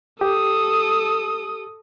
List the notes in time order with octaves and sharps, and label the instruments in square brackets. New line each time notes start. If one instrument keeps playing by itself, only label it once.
[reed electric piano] G4 [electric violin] A4 D#6